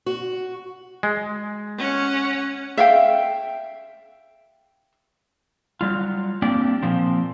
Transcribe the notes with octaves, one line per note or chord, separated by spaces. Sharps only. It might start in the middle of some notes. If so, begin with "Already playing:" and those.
F#4
G#3
C#4 F#5
E5 F5 G5
F#3 G3 F4
A#3 C4 D4 G4 D5 G5
A#2 F3 C4